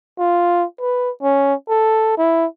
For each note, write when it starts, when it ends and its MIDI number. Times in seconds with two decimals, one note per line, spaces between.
0.19 0.65 65
0.80 1.11 71
1.22 1.54 61
1.69 2.14 69
2.18 2.46 64